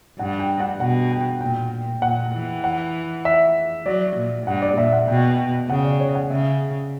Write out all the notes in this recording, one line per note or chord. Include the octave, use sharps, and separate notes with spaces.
G2 F#5
G5
F#5
B2 F#5
G5
A#2 G5
A#2 F#5
E3
F#5
E5
F#3 D5
A#2
G2 F#5
D5
A#2 E5
F#5
B2 G5
G5
C#3 F#5
D5
C#5
F#5
C#3 E5